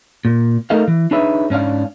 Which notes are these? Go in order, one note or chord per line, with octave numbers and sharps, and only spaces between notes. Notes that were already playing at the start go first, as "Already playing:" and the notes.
A#2
A3 D#4 A4 A#4 D#5 F5
E3
D4 D#4 G#4 B4 C#5 E5
G#2 C#4 D4 F5